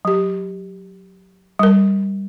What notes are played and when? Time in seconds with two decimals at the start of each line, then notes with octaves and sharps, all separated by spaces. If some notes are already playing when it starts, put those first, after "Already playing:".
0.05 F#3 G4
1.59 G3 A#4